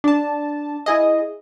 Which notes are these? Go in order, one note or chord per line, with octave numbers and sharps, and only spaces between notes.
D4 A5
E4 G#4 D#5